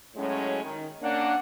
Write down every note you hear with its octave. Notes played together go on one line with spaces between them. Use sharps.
A2 F#3 G#3 C#4
D#3
A#3 C#4 D4 F#5